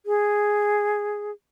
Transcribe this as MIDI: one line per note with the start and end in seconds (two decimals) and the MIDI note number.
0.06 1.31 68